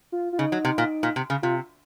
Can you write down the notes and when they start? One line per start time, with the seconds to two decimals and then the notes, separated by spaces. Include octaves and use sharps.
0.12 F4
0.33 F4
0.39 C#3 D#4
0.52 F#3
0.65 C3
0.78 A#2
1.03 A#2
1.16 C3
1.30 C#3
1.42 C3 F4